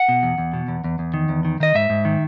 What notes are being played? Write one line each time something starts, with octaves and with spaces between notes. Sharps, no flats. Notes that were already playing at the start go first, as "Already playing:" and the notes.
Already playing: F#5
B2
E2
E2
B2
E2
E2
E2
D#3
E2
D#3
D#3 D#5
G#2 E5
G#2
D#3